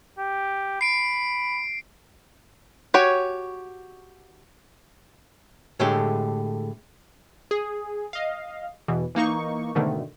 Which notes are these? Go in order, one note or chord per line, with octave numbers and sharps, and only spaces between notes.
G4
B5 C7 D7
F#4 G4 C#5 G#5
A2 D3 G#3 A3 G4
G#4
D#5 F5
E2 B2 E3
E3 A#3 D#4 C#6
G#2 B2 D3 D#3 A3